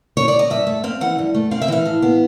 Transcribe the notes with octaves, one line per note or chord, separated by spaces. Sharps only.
C#5
D5
D#5
G2 E5
A3
C4 F5
E3 F#5
G2
A3
C4 F5
E5
E3 F5
A2
B3